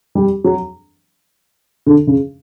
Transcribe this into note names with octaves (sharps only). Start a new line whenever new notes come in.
G3
F#3
D3
C#3